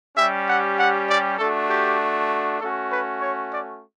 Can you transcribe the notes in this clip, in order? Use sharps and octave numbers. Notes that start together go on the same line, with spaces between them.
G3 C#4 G4 E5
F#5
F#5
D5
A3 D4 F#4 A4
G4
A3 C#4 F#4 A4
B4
C#5
D5